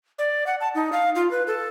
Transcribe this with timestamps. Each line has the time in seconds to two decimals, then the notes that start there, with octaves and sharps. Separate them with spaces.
0.19 D5
0.47 F#5
0.60 A5
0.75 D#4
0.93 F5
1.16 F4
1.31 B4
1.47 A4